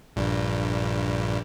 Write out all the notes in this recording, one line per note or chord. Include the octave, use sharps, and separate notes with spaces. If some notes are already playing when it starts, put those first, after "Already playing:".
A#1 G2